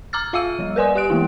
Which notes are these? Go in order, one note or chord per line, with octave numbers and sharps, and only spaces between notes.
A#5 D6 E6 F6 A6
F4 E5 F5 D6 E6 D#7
F3 G3
A#4 B4 D5 G#5 C6 D#6
G4 D#6 F#6 D7
E3 G#3 A#3 B3 E4